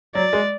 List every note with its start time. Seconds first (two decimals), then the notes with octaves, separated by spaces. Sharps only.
0.15 F#3 D5
0.33 G#3